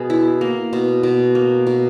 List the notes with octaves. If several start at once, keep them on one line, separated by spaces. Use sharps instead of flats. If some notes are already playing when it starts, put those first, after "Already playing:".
Already playing: B2 G#4
E4
A#3
B2
B2
A#3
B2